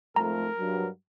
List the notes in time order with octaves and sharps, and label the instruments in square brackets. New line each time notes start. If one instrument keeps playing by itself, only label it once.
[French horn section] F2 G#2 A3 [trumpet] A#4 [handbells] A#5
[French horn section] G2 F#3